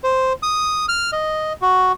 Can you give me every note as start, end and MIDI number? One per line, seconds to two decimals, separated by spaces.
0.04 0.33 72
0.43 0.86 87
0.89 1.11 89
1.13 1.53 75
1.62 1.92 66